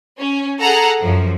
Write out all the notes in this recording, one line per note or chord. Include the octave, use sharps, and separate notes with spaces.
C#4
G#4 A4 F#5 A#5
F#2 F3